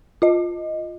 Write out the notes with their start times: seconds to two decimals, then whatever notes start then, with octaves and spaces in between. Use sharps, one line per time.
0.22 F4 D#5